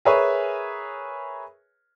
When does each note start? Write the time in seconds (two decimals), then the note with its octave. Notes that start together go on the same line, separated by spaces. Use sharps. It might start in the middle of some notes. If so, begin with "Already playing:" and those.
0.05 G#4 A#4 B4 C#5 E5 G#5